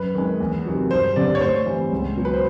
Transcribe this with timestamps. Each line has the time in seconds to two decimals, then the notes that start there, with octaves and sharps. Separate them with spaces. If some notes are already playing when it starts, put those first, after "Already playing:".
Already playing: F#2 B4
0.15 D#3 G#3
0.40 E2
0.65 C3 D#3 F#3
0.91 G2 C5
1.16 D3 G3 B3 D5
1.35 C#5
1.41 A2 C5
1.66 E3 G3 C4
1.92 C#2
2.17 B2 F#3 B3
2.25 B4
2.34 C5